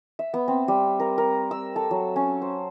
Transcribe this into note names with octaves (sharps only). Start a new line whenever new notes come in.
E5
B3
C4
G3
A#4
A#4
E6
A4
F#3
C#4
C5